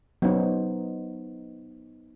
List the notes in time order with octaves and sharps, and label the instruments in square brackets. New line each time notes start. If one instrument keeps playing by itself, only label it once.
[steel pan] F#3 C#4 [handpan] B3 D#4 C5